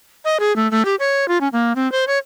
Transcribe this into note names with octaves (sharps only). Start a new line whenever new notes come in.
D#5
G#4
A3
A3
G4
C#5
F4
C#4
A#3
C4
C5
C#5